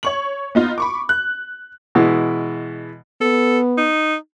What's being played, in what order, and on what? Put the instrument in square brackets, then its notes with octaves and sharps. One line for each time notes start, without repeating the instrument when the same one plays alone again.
[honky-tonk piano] C#5 C#6 F#7
B3 D#4 F4
B5 C#6 D6
F#6
[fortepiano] B2 E3 G#3
[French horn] B3 [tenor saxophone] A4
[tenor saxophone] D#4